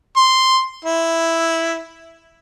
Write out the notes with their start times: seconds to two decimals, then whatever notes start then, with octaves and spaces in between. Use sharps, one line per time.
0.17 C6
0.85 E4